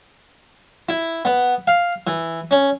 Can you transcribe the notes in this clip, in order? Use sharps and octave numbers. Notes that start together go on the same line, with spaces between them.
E4
B3
F5
E3
C#4